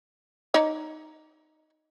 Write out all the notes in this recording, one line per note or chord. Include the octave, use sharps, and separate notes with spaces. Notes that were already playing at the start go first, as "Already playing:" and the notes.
D#4 C#5 D5